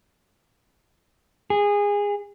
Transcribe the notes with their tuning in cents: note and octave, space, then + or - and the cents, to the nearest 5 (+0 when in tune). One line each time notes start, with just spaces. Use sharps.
G#4 -20